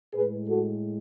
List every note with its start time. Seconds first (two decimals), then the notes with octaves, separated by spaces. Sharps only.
0.14 A2 G#3 G#4 B4
0.48 F#4 A4